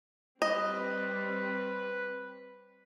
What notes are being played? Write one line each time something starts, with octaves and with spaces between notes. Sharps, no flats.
G3 C4 B4 D#5